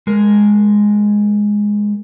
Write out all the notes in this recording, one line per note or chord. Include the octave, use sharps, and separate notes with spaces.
G#3 A#4